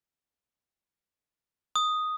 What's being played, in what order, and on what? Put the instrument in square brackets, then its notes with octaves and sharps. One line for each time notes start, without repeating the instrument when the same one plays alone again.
[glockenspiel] D#6